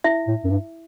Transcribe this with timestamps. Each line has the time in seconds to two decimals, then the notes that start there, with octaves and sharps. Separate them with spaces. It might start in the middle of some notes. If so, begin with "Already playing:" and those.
0.04 E4 E5
0.28 A2
0.44 F#2
0.50 G2